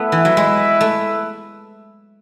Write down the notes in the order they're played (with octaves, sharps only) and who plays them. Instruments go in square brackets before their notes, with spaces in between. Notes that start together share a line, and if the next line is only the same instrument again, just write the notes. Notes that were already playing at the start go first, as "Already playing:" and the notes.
Already playing: [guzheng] A3 B3 [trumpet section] E4 B4 E5
[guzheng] E3
F#3
G#3
A3